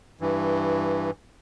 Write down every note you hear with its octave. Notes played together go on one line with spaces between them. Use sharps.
G2 E3